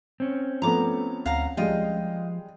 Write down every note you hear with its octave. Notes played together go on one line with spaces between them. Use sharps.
C4 C#4
F3 A3 B3 A#5 D6
D2 F5 F#5 A#5
F3 G3 G#3 F4 D#5 G5